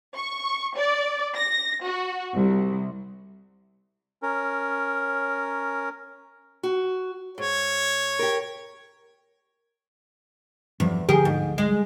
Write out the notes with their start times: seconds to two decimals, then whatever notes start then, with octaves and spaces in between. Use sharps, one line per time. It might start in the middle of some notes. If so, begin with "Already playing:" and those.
0.15 C#6
0.77 D5
1.35 A#6
1.85 F#4
2.35 C2
4.23 C#4 A#4
6.63 F#4
7.38 G#2 C#5
8.19 G4 A#4
10.80 E2 G2 F3 F#3
11.09 D1 D3 F3 G4 G#4 A#4
11.25 G#2
11.58 G#3